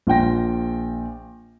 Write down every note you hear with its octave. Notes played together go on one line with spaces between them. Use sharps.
A#1 F4 G5 A#6